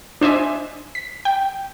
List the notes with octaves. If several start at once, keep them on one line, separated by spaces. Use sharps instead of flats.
D4 C5 D#5 E5 G#5
B6
G5